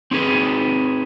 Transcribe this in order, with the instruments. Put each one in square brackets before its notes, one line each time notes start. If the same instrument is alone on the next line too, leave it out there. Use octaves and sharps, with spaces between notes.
[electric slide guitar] C4 D#4 G#4 B4